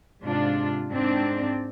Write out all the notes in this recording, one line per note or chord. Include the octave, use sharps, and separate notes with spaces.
G#2 C3 D4 F4
G#2 C4 D4